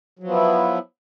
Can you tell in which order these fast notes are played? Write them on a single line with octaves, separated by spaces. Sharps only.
F#3 F3 B3 E4